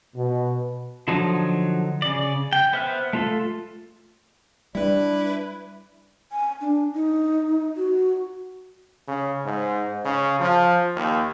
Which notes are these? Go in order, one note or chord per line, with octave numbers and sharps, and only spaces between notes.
B2
D3 F3 F#3 D#4
C#3 D5
G5
B3 C5 E5 F6 F#6
A3 F4 A4
G3 D4 E4 B4 D5
G#5
D4
D#4
F#4
C#3
G#2
C#3
F3
D#2